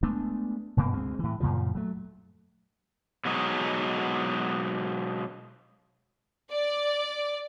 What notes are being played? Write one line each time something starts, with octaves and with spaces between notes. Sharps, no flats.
G#3 A3 B3 D4
F1 G2 B2 A#3
D2 G#3 C4
A2 E3
F#2 A#2 C#3 F3
F#3 A3
B2 F#3 G#3 D#4
D5